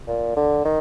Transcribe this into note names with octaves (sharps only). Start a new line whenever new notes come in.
A#2
D3
D#3